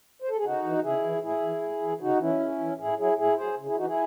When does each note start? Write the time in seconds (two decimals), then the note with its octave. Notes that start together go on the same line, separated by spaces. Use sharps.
0.22 C5
0.30 A4
0.38 G#4
0.44 C#3 D#4 F#4
0.64 E3
0.83 C#3 E4 G#4
1.03 E3
1.22 A2 E4 G#4
1.42 E3
1.62 A2
1.82 E3
2.01 C#3 D#4 F#4
2.20 E3 C#4 E4
2.40 C#3
2.59 E3
2.79 A2 E4 G#4
2.98 F#3 E4 G#4
3.18 A2 E4 G#4
3.37 F#3 G#4 C5
3.57 C#3
3.67 E4 G#4
3.77 E3 D#4 F#4
3.87 E4 G#4